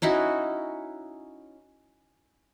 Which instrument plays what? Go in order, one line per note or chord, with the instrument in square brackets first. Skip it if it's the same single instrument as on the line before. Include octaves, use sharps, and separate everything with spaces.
[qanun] C#4 D#4 E4 F#4